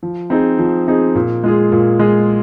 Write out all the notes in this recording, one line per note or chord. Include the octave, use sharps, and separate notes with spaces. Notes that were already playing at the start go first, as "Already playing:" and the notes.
F3
C4 D#4 G#4
F3
C4 D#4 G#4
A#2
G#3 F4 G#4
A#2
G#3 F4 G#4